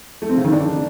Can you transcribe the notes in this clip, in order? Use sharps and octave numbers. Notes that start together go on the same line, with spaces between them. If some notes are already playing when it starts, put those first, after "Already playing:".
A3
C4
C#3
D#3
D4